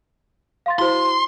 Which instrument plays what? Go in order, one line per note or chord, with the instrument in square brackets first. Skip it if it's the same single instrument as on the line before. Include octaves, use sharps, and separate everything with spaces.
[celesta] F5 C6 A6
[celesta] E4 F#4 C5 [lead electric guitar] C6